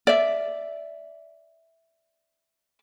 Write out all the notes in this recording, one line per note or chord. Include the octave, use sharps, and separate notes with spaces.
D5 E5